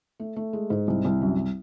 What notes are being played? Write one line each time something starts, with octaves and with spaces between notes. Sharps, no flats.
A3
A3
G#3
G#2
C2
C2
F#2